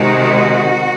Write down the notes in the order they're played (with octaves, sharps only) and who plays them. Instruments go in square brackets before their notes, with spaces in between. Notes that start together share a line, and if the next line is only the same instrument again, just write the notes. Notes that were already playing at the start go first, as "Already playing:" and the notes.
Already playing: [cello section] C3 D#3 G#3 F#4